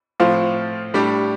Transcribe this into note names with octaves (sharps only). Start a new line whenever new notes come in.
A2 F3 C4 F4
A2 G3 D4 G4